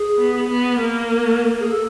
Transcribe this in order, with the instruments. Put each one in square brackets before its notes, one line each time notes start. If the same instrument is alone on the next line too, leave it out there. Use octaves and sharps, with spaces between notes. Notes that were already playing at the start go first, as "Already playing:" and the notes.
Already playing: [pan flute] G#4
[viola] B3
B3
A#3
[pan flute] G#4
A4